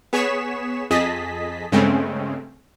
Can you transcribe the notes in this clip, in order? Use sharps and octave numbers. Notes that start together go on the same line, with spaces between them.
B3 G#4 C#5 C#6 B6 E7
F2 G#4 D#5 A5 B6
G2 C#3 G#3 A3 C4 C#4